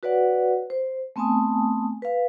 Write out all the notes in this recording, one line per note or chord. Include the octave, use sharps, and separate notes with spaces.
F#4 B4 C#5 D5 F#5
C5
A3 B3 C4 G#5 A5 D#6
B4 F5